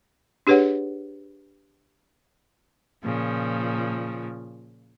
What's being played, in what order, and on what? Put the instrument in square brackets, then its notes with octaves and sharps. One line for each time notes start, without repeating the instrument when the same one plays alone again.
[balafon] D4 G4 G#4 B4 C#5 F#5
[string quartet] A#2 C#3 F3